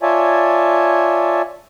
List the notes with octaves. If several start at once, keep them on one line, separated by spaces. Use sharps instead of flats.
F4 C#5 D5 E5 G#5 A5